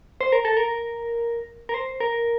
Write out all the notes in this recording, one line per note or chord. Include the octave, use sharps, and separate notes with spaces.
C5
A#4
A4
A#4
A#4
C5
A#4